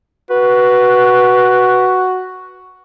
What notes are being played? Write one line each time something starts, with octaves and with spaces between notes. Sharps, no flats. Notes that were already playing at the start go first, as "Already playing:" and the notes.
F#4 B4